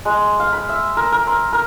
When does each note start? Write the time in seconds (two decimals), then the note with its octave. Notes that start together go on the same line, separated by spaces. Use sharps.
0.05 G#3
0.40 F5
0.53 B5
0.69 E5
0.97 A#4
1.12 A#4
1.27 C6
1.53 A#4